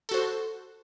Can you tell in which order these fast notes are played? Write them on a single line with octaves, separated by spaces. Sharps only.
A4 F#4 C5